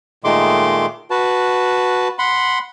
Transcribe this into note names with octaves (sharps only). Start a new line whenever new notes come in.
A#2 D#3 G#3 A3 C6 D6
F#4 B4 A5
F#5 B5 C6